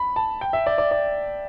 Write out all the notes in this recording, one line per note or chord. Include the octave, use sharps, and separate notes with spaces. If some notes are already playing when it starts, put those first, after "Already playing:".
Already playing: B5
A5
G5
E5
D5
D5
D5